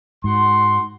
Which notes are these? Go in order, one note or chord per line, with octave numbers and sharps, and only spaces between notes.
G#2 F#4 C6